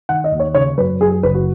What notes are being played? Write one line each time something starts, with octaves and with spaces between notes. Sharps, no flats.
D#3 F#5
D#5
D#2
C#5
C#3 C#5
F#2 B4
F#2 G#4
G#4
F#1 B4
F#4